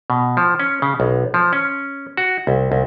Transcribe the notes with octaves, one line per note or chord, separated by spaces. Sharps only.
B2
F3
C#4
C#3
B1
F3
C#4
F#4
C2
C2